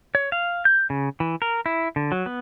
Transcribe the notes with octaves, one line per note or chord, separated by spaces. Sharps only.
C#5
F5
G6
C#3
E3
A#4
E4
D3
F#3
B3